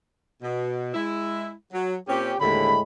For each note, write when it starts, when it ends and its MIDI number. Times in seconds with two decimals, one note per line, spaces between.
0.42 0.90 47
0.94 1.52 56
0.94 1.52 64
1.73 1.96 54
2.08 2.34 46
2.08 2.34 60
2.08 2.34 61
2.08 2.36 67
2.40 2.74 39
2.40 2.80 45
2.40 2.74 50
2.40 2.80 56
2.40 2.80 83